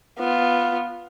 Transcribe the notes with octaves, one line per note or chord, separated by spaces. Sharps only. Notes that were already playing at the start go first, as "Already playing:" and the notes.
B3 F4